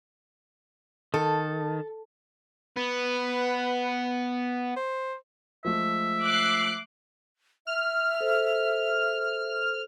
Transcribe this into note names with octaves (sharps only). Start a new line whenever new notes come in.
D#3 A4
B3 B4
C5
F3 G#3 A3 E5
D6 F#6 C7
E5 F6
A4 C5